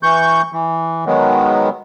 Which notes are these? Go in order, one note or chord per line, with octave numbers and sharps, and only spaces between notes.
E3 C#6 G6
E3
D#3 F#3 G#3 B3